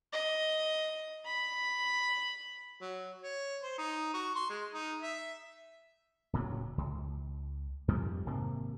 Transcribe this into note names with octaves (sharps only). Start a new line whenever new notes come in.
D#5
B5
F#3
C#5
C5
D#4
F#4
C6
G#3
D#4
E5
D1 A#2 C#3 F#3
C#2
F2 G#2 F3 G3
G#1 C3 A#3